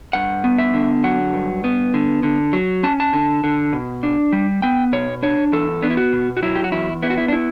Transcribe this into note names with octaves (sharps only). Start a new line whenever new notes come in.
G2 F#5
B3
E5
D3
F#3 F#5
G2
B3
D3
D3
F#3
C#4 A5
A5
D3
D3
B2
D4
G3
B3 G5
B2 C#5
D4 C#5
E2 A4
B3 D4
E4
F#4
B2
F#4
F#3 E4
G4
F#4
E2 E4
B3 E4
F#4
E4
D4
E4